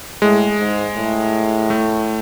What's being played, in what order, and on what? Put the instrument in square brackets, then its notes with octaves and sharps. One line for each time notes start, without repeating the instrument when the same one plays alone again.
[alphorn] A2 [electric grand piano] G#3
[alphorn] G#2
A2
[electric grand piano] A3